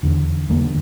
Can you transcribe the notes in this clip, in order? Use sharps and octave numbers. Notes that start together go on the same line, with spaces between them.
E2 D3
E2 D3 G3 A#3
D3